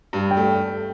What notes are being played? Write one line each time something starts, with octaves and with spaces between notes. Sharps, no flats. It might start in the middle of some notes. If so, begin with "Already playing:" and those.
G2
G5
A3